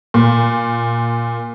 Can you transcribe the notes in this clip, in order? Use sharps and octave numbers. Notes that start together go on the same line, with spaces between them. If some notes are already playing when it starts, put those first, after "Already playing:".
A#2